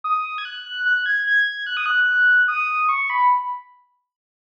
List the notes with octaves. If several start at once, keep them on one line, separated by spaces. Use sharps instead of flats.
D#6
G#6
F#6
F#6
F#6
G#6
G#6
F#6
D#6
F#6
D#6
C#6
B5